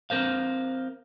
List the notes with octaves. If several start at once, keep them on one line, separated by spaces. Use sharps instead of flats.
C4 A#4 C5 F5